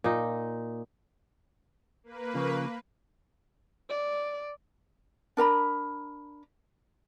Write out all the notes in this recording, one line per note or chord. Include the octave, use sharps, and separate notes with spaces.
A#2 D#4
A#3 B4
C#3 F3
D5
D4 A#4 A#5 B5